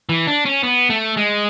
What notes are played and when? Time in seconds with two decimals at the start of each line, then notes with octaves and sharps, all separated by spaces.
0.09 E3
0.27 D4
0.45 C#4
0.63 B3
0.90 A3
1.17 G#3